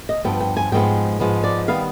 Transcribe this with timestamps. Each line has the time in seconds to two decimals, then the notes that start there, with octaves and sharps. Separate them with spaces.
0.09 D#5
0.24 G2 F3 B3 G5
0.40 G5
0.57 G#5
0.72 G#2 F3 G#3 B3 G5
1.20 G#2 F3 G#3 B3
1.44 D5
1.68 D#3 G3 B3 F5